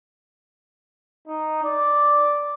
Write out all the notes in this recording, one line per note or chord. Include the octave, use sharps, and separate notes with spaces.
D#4
D5